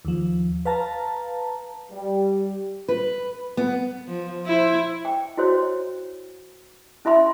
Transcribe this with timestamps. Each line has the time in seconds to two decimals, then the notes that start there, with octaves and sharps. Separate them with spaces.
0.05 D#2 F3
0.65 B4 F5 A5 A#5
1.92 G3
2.88 B4
3.57 B3
4.08 F3
4.46 E4 C5
5.05 G5
5.37 E4 F#4 C5 C#5
7.05 C#4 E4 E5 B5 C6